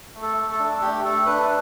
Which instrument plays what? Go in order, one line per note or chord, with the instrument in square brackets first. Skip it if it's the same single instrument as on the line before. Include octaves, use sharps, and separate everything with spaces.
[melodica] A3
A4
A3
A4
D4
A3 G4
A3 A4
D4 B4